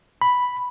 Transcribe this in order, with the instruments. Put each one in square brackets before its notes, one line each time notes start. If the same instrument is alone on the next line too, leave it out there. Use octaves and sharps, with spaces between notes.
[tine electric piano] B5